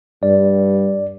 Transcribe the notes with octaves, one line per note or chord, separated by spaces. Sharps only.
G2 D5